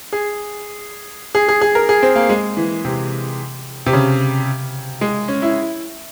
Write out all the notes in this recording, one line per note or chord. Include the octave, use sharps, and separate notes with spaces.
G#4
G#4
G#4
G#4
A#4
G#4
C4
A#3
G#3
E3
C3
C3
C#3
G#3
C#4
E4